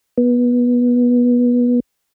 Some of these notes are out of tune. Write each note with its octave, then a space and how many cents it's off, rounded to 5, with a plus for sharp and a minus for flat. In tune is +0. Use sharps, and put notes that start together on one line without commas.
B3 -20